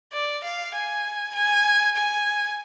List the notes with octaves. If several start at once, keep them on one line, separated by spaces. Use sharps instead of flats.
D5
F5
G#5
G#5
G#5